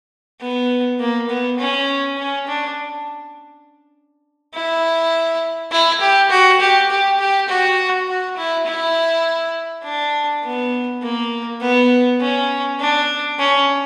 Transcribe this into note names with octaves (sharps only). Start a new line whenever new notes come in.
B3
A#3
B3
C#4
C#4
D4
E4
E4
G4
F#4
G4
G4
G4
F#4
F#4
E4
E4
D4
B3
A#3
B3
C#4
D4
C#4